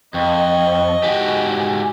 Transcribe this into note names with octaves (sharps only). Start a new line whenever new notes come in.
F2 D#5 G5 C#6
G#2 F#4 G4 G#5